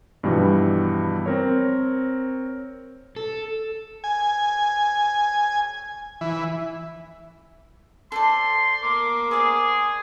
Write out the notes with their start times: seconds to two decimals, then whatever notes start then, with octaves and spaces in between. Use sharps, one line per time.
0.23 G2 B2 E3 F3 G3
1.26 C4 A#4 C#5
3.16 A4
4.04 G#5
6.21 E3
8.12 A4 C5 D5 C6
8.83 A#4 D6
9.31 G#4 C5 D5 E5